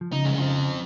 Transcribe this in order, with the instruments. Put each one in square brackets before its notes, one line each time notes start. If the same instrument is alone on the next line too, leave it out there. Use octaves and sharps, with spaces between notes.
[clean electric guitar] F3
[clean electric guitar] C#3 [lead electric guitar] D#4
[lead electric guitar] C2 G#3
F3 C4